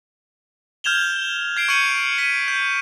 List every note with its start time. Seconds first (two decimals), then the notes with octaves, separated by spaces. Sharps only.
0.84 F6 G6 G#6 E7 F7 G7
1.57 G#6 C7 D7
1.68 C#6 G6 G#6 C#7 D#7 F#7
2.18 B6 D#7
2.48 G6